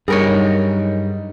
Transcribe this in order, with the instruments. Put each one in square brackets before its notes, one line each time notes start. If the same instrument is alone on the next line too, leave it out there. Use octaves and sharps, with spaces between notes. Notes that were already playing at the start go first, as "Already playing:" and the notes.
[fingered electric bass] G2 [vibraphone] F#3 D#4 D#5 [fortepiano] G3 [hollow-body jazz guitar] G#4 A#4 C#5